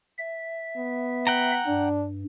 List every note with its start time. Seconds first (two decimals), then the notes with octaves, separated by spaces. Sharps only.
0.18 E5
0.77 B3
1.27 F#5 G5 A#5
1.67 G2 D4